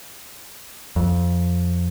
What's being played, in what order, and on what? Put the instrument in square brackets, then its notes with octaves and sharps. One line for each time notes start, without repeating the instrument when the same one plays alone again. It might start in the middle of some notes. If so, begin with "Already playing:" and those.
[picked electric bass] F2